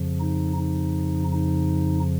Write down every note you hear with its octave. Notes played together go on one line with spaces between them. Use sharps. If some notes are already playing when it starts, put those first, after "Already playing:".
Already playing: F2 C#3 F3
D#4
D#4
D#4